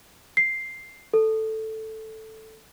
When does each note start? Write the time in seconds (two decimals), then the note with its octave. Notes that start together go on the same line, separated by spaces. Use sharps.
0.37 C7
1.14 A4